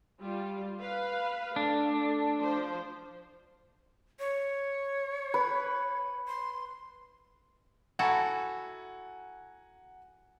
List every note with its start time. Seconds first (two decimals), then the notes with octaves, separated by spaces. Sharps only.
0.21 G3 F4
0.80 B4 F5
1.56 A3 D4
2.40 F3 C5
4.19 C#5
5.34 B4
6.28 C6
7.99 E4 F#4 A4 F#5 G#5 A#5